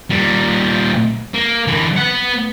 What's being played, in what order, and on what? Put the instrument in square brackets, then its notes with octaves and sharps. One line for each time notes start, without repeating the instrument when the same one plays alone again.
[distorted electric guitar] A#2 G3
A#3
D3 E3
B3 F#5